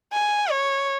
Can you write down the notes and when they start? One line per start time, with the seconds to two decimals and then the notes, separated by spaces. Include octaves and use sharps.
0.13 G#5
0.51 C#5